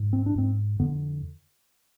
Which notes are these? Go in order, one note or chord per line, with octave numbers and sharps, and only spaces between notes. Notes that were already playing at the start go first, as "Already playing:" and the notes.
Already playing: G#2
C4
D4
G#2 C4
F2 D3 B3